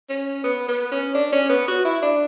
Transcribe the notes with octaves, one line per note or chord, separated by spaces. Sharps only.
C#4
B3
B3
C#4
D4
C#4
B3
F#4
E4
D4